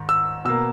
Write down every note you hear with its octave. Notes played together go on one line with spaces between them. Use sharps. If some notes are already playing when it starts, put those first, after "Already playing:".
Already playing: G#2 D#3
E6
B2 A#3 E6